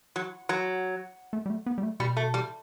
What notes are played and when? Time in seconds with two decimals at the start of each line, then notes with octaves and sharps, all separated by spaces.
0.16 F#3
0.49 F#3
1.33 A3
1.46 G3
1.50 A3
1.66 B3
1.78 G3
1.83 A3
2.00 B2 G3
2.17 A3
2.34 G3